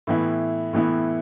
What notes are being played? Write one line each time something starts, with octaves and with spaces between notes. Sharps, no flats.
A2 E3 B3 E4
A2 E3 B3 E4